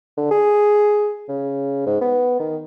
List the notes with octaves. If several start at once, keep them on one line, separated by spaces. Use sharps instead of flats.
D3
G#4
C#3
G#2
B3
D#3